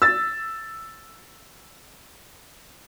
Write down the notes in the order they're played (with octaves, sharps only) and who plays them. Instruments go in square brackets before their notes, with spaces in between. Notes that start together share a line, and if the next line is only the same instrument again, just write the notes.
[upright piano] E6 A6